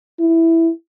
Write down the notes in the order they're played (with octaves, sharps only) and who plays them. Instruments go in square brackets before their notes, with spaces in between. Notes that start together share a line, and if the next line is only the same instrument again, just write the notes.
[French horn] E4